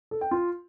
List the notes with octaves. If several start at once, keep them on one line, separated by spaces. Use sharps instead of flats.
A4
G5
F4